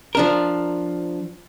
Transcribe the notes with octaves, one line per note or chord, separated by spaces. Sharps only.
F3 D4 A#4